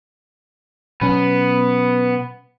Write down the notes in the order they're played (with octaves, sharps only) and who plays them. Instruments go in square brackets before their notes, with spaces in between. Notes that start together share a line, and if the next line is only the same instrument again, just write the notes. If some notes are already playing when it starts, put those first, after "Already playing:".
[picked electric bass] B2 F#3 C#4 [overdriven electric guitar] B3